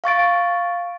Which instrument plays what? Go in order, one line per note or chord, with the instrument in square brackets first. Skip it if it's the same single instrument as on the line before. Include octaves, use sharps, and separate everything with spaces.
[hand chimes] F5 C#6 A6 D7